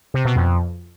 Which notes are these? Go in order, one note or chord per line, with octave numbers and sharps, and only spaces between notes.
C3
B2
F2